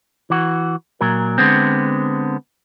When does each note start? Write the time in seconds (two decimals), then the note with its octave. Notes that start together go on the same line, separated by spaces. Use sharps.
0.30 E3 F#4
1.01 A#2 F#3 A#4
1.38 D3 G#3 B3 C4